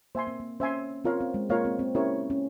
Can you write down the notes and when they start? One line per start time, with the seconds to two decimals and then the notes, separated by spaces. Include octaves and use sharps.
0.15 A#3 C5 E5 G#5 C6
0.27 C4
0.40 A#3
0.60 C#4 C5 E5 G#5 C6
1.04 C4 F4 A#4 C#5 F5
1.20 C4
1.34 G#3
1.50 A#3 F4 A#4 C#5 F5
1.65 C4
1.79 C4
1.95 C#4 E4 G4 A#4 C#5
2.30 C#4